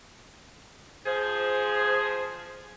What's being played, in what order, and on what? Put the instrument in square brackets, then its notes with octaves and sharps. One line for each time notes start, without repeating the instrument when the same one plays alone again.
[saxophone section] F3 G#4 [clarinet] C5